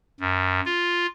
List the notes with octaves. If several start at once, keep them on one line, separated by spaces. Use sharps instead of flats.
F#2
F4